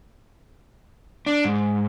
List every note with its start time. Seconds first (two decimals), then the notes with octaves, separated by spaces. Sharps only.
1.26 D4
1.44 G#2